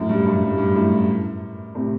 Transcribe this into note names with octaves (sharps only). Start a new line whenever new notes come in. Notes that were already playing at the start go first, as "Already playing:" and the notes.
Already playing: F#2 A2
G2
F#2
G2
A2
G2
F#2 A2
A2 C3